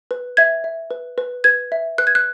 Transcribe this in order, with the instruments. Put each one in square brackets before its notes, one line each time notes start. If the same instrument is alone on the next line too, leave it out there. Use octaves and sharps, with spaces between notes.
[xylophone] B4
E5 G#6
E5
B4
B4
B4 G#6
E5
B4 F#6
G#6
F#6